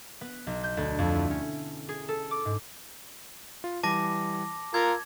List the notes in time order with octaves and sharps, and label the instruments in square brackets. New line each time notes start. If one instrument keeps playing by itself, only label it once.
[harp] B3
B1
G6
D2
F2
E4
C#4
G#4
A4
D6
G#2
[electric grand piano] F4
[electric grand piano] E3 G3 [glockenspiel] A5 D6 A#6
[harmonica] F4 A#4 [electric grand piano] E6 [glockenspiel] G#6